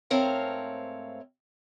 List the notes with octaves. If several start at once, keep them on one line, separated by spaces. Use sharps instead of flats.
G#2 A3 C4 A#4 C#5 F5